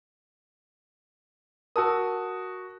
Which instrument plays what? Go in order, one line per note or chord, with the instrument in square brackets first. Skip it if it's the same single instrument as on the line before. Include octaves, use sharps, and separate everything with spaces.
[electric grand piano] F#4 D#6 [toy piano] A#4 A5 E6